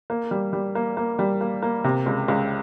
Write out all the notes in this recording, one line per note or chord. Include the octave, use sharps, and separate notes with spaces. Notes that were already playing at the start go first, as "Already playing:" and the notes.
A#3
G3
G3
A#3
A#3
G3
A#3
A#3
C3
C#2
C#2